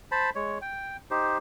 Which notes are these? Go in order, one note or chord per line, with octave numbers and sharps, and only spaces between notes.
C5 A5 B5
G#3 C#5
G5
D#4 G4 C5